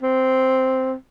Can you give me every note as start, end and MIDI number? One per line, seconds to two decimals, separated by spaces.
0.03 0.94 60